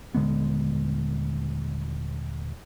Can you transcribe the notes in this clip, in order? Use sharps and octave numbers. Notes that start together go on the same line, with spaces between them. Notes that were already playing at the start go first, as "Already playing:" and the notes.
D#1 D3 G#3 B3